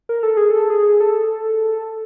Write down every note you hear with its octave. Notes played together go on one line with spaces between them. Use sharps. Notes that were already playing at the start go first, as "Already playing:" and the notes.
A#4
A4
G#4
A4
G#4
A4